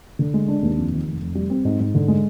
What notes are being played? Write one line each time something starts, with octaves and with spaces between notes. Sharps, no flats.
D3
G#3
D4
D#2
F2
D#3
F1
F1
G3
C4
G#2
G#2
D3
G#3